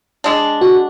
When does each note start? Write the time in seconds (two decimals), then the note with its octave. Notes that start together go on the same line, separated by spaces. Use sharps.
0.24 G#3 D4
0.61 F#4